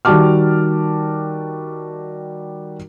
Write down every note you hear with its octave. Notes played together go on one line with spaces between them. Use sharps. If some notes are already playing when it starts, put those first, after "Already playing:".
D#3 G3 F#4 A5 D6 F6